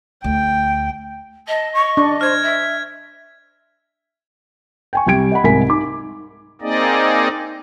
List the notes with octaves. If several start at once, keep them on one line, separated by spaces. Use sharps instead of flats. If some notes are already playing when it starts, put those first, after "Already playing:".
D2 G5
D#5 A5
C#6
D4
C5 F6 G#6
E5
G5 G#5 C#6
C2 G3 G5 G#6 D7
D#5 F#5 B5
C2 G#2 A#4 G#5 B6
D#4 D6
A#3 C4 D#4 G#4 D5 D#5